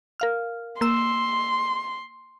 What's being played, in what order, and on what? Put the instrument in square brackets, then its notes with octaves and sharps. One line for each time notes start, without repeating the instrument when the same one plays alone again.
[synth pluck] A#4 F5 F6
[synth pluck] A#3 E6 E7 [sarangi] C6